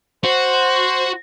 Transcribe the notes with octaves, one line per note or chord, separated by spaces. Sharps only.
F#4 C5